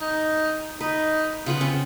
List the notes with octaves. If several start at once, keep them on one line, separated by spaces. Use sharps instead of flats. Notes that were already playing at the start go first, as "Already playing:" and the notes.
D#4
D#4 B4
C#3 B3 F4 B4
C4 C#4